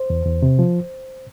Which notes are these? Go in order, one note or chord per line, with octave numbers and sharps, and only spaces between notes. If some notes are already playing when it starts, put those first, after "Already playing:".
Already playing: C5
E2
E2
C3
F3